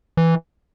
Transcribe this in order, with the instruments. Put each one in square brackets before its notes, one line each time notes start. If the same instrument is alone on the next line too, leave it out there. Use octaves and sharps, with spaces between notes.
[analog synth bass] E3